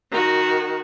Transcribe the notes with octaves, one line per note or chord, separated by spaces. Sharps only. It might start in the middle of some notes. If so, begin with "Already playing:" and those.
D#3 F#4